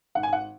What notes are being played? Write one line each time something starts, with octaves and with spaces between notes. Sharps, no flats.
G#1 F#5
G#5
F#5